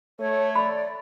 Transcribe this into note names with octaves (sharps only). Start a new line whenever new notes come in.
A3 C#5
D5 B5